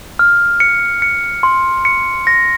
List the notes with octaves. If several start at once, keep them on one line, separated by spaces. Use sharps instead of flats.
F6
C#7
C#7
C6
C#7
A#6